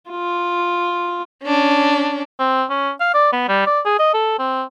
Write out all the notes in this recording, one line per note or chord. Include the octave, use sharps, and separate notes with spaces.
F4
C#4 D4
C4
C#4
F5
D5
B3
G3
D5
G#4
D#5
A4
C4